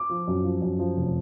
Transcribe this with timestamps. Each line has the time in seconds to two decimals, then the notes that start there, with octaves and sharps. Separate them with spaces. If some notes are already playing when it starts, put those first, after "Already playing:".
Already playing: D6
0.09 F3
0.27 F#2
0.44 F3
0.62 F#2
0.79 F3
0.96 F1